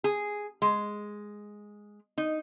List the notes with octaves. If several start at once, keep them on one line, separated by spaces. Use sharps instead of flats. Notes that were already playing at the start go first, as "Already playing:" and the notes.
G#4
G#3
D#4